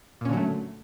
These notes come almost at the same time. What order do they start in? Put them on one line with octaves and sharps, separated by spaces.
A#2 C#4 D3 F#3 A3